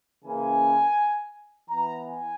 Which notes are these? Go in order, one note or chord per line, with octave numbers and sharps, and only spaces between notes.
C#3 E3 A#3 C#4 G#5
E3 B3 A#5
G#5